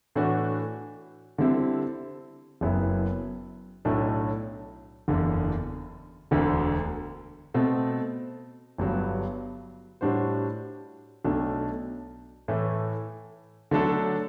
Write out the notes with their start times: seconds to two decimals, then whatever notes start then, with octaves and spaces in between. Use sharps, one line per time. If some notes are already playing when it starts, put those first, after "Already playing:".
0.16 A2 E3 A3 D4 F#4
1.38 D3 G3 C4 E4 A4
2.61 F#1 F#2 F#3 B3 E4
3.85 B1 A2 F#3 A3 D4
5.08 F#1 E2 D3
6.31 E1 D2 D3
7.54 B2 A3 C4
8.78 G1 G2 F#3 B3
10.01 A2 G3 D4 F#4 C5
11.25 B1 B2 A3 D4
12.48 A2 E3 A3
13.71 D3 F#3 A3 D4 A4